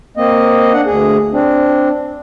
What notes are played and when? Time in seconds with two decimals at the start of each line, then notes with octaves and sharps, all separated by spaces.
0.17 A#3 C4 D#5
0.73 D4 F#5
0.86 D2 G#4
1.33 C4 D4